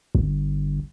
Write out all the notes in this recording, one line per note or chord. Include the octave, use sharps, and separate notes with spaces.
G1